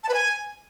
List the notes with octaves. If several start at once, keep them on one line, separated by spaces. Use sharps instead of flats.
A5
B4
G#5